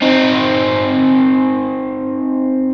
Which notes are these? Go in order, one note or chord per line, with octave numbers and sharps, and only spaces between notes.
C4 D#4